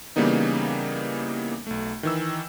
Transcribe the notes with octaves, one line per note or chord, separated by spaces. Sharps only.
C#3 E3 G3 A#3 B3 D#4
B1 A3
D#3 E3 E6